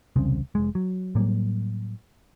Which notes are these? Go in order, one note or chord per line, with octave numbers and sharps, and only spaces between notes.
E1 C2 C#3 C4
F1 G#3
F#3
A2 F#3 G3 A#3